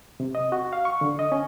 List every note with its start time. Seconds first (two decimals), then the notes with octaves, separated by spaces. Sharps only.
0.20 C3
0.35 D#5
0.52 F#4
0.73 F5
0.85 C#6
1.01 D3
1.19 D#5
1.32 C#4